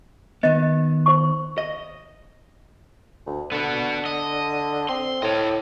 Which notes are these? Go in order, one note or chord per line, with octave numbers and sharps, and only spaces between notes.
D#3 B3 D#5
C5 C#6
D#5
D2
D3 B3 F#4
D#5
C4 C6
A2 C#5 D#5